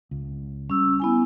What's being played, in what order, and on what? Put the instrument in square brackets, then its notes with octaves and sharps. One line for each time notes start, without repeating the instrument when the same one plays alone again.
[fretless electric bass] C#2
[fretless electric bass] G3 [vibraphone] C#4 E6
[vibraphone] B3 E4 G#5